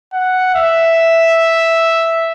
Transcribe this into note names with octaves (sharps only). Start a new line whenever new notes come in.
F#5
E5